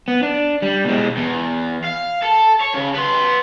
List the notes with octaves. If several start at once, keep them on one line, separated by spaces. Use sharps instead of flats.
B3
D4
G3
B2 G#3
E2
F5
A4
C#5
C#3
B3 C6